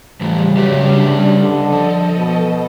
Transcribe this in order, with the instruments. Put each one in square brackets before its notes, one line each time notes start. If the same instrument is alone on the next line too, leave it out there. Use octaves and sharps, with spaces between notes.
[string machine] C#3 G3 [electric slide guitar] E3 A3 [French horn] F3
[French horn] F#3 [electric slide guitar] G4 B4 E5
[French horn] D4
[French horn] D3 [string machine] A4 D#5
[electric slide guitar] F3
[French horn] B2